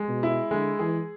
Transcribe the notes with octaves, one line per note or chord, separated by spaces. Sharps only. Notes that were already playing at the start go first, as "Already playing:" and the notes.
Already playing: G#3
B2
E4
D3 G#3
E3 G#4